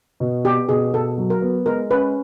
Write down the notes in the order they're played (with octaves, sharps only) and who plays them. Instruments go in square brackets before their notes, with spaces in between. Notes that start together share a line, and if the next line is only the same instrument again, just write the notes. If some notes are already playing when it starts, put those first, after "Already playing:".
[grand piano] B2
[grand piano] B3 [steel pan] G4
[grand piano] B2 [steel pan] G#4
[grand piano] B2 [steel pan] A4
[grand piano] F#3
[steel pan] A#4
[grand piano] B3
[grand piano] G#3 [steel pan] A#4
[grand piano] C#4 [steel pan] B4